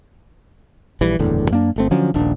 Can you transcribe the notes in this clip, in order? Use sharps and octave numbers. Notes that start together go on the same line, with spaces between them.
A#1 E3 G3
F#1 E2 A2 D3
F#2 A#3 D4
G1 A3 C4
D3 F3 F#3 C#4
D#1 A#1 D4